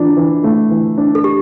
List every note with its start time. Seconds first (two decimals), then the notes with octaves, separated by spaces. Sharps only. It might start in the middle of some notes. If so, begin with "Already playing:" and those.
Already playing: E3 D4 F4
0.17 E3
0.44 A3
0.71 E3
0.98 D4
1.15 A4
1.24 G4